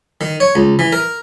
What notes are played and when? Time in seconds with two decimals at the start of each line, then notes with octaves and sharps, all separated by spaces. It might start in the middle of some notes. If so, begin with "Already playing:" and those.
0.21 D#3
0.40 C#5
0.55 C#2
0.79 E3
0.92 A#4